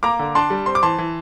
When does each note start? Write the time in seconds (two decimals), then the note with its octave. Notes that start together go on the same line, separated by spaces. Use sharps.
0.03 A#3 A#5 D6
0.19 D3
0.35 D4 A5 C6
0.50 G3
0.66 C4 C6
0.75 D6
0.83 E3 A5 C6
0.98 E3